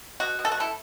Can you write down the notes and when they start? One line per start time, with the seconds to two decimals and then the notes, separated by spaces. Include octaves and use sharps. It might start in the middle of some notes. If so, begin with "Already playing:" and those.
0.20 B2 F#4
0.39 B2
0.45 A4
0.52 F#4
0.57 A3 E4 A4